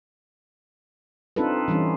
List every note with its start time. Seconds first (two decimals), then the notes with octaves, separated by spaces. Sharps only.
1.36 C4 D4 D#4 F4 A4 B4
1.68 E3 G3 C4 C#4 D#4